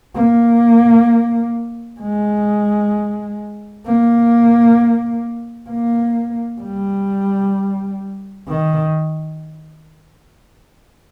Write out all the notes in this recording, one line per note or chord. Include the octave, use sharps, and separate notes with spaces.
A#3
G#3
A#3
A#3
G3
D#3